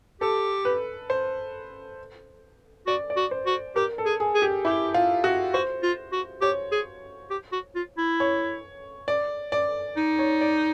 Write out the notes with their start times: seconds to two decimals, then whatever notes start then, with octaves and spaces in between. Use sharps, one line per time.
0.21 G4 A4
0.65 B4
1.10 C5
2.87 F#4 D5
3.10 D5
3.17 F#4
3.31 C5
3.46 F#4
3.76 G4 A#4
3.98 A4
4.06 G#4
4.20 G#4
4.35 G#4
4.42 G4
4.65 E4 G4
4.94 F4
5.24 F#4
5.54 F#4 C5
5.83 F4
6.12 F#4
6.42 G4 C#5
6.72 G#4
7.31 G4
7.53 F#4
7.75 F4
7.98 E4
8.20 C#5
9.08 D5
9.52 D5
9.97 D#4
10.19 C#5
10.41 D5